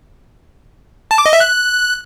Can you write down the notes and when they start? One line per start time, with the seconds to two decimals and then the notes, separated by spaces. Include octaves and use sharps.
1.11 A5
1.18 D6
1.26 D#5
1.33 E5
1.40 F#6